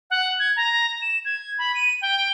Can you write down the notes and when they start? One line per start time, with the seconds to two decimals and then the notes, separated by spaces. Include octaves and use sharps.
0.10 F#5
0.39 G#6
0.56 A#5
1.02 E7
1.25 G#6
1.58 B5
1.75 D#7
2.02 G5